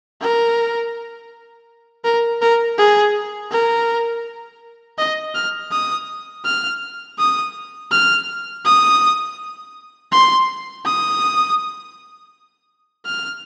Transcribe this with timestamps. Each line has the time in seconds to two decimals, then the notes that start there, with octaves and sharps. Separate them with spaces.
0.21 A#4
2.05 A#4
2.41 A#4
2.78 G#4
3.51 A#4
4.98 D#5
5.35 F6
5.72 D#6
6.45 F6
7.19 D#6
7.92 F6
8.65 D#6
10.12 C6
10.86 D#6
13.06 F6